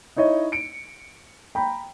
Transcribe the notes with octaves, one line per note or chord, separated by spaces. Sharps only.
D#4 E4 C#5 D#5
C#7 D7
G5 A#5 B5